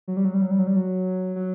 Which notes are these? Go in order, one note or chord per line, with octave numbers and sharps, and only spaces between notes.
F#3
G3
F#3
G3
F#3
G3
F#3
G3
F#3
F#3